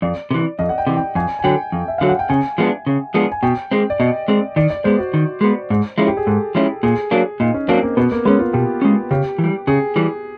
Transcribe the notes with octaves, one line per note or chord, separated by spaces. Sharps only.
F2 D5
C3 E3
F2 D#5
F#5
G5
C3 E3
G5
F2 G#5
G#5
D3 F#3 G5
F2
E5
D3 F#3 F5
F#5
G5
C#3 G#5
F3 G#3 B3 D4
C#3
F3 G#3 B3 D4
G#5
B2 G5
G#3 C4
D5
B2 D#5
G#3 C4
D#3 D5
D5
G#3 B3 C5
F#4
D#3
G#3 B3
G#2
F3 G#3 C#4 E4
G4
G#4
G#2 A4
F3 G#3 C#4 E4
A#2 G#4
F#3 A#3 D4
A#2 D#4
C#4
F#3 A#3 C4 D4
A#3
B2 B3
A#3
G#3 B3 C#4
F4
B2 G4
G#3 C#4
C#3 G4
E3
G3
C#3 G#4
E3 G3